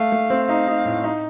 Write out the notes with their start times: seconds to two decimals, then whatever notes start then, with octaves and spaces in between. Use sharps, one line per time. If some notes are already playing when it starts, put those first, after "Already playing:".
Already playing: A3 F5
0.12 A3
0.30 C4
0.49 D#4 F5
0.67 D#4
0.85 A2
1.04 D#4